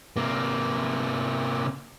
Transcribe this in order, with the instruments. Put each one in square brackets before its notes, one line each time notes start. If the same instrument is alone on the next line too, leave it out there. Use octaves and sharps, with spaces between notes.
[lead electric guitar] C3 A#3